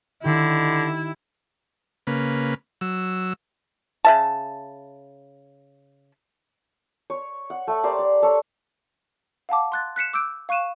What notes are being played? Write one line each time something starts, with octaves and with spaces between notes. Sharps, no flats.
D3 D#3 E4 G4
C#3 A#3 B4
F#3 E6
C#3 E5 A5
C#5
F#5
A3
G4 A#4 C5 D5
D5
A4 C#5
F5 F#5 A5 D6
C6 F#6 A6
F#6 B6 C#7 E7
D6 E6 F#6 G6 D7
F5 C#6 F#6 D#7 E7